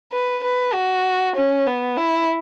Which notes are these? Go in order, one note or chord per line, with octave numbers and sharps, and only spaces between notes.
B4
B4
F#4
C#4
B3
E4